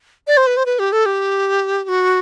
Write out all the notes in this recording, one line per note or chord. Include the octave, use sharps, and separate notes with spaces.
D5
C5
B4
C5
B4
G4
A4
G4
G4
F#4